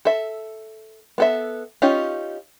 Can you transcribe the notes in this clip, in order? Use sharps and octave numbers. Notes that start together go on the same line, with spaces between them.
A4 E5
B3 A4 E5
C#4 D#4 F4 G4